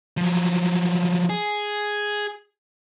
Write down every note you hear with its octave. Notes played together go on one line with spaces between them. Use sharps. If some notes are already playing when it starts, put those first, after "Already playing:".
F3 F#3
G#4